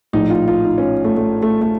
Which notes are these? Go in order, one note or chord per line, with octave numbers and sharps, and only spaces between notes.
A#1 A2 D#4
F4
F4
D#4
C#4
A3
A3
A3
A3